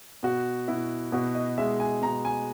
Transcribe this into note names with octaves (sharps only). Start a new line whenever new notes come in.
B2 F#4
B2 E4
B2 F#4
D#5
G#3 E5
G#5
B2 A#5
G#5